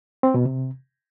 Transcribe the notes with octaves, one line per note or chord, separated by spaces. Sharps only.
C4
B2
C3